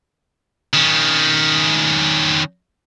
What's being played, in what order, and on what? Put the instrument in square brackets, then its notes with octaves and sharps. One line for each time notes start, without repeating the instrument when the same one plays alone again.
[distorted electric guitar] D#3 C#4